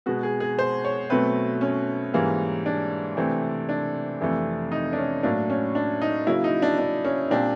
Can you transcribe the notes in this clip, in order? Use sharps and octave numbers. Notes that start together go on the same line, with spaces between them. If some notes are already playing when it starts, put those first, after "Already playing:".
B2 G#3 B3 F#4
G#4
G#4
C5
C#5
B2 F#3 A3 C4 B4
C#4
G#2 E3 G3 A#3
D4
C3 E3 A3 C4
D4
F2 C3 E3 A3
D#4
D4
C#4
A2 F#3 A#3 D4
C#4
D4
D#4
C#3 F#3 A#3 E4
D#4
D4
D4
C#4
A#2 G3 C4 D4